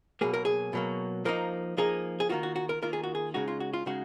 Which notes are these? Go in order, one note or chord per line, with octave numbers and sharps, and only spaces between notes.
B2 F#3 A#3 G#4
A#4
G#4
B2 F#3 A#3
F3 A#3 D#4 A#4
F3 A#3 D#4 G#4
G#4
D#3 A#3 F4 F#4
F#4
F#4
A#4
D#3 A#3 F4 A#4
G#4
F#4
G#4
C#3 G#3 D#4 F#4
F4
F#4
F4
C#3 G#3 D#4 F#4